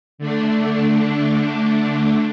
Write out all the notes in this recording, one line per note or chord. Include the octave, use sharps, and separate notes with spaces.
D3 A3 D4